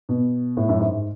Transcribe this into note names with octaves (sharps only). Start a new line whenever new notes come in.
B2
A2
F#2
G#2